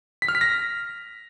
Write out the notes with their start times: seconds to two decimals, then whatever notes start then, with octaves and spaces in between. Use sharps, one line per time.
0.22 B6
0.28 F6
0.35 B6
0.41 A#6